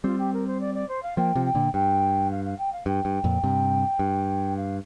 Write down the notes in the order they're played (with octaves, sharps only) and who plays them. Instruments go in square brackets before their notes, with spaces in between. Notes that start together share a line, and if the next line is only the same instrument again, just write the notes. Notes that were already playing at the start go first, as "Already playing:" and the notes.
[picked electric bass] G3 C4 [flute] F4
[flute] G4
A#4
C5
D5
D5
C5
F5
[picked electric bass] F3 A#3 [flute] G5
[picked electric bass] C3 F3
[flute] G5
[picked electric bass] A#2 D3
[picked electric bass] G2 [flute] G5
[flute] F5
F5
G5
F5
[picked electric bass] G2 [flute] G5
[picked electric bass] G2
F2 A#2
G2 C3
G2
[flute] F5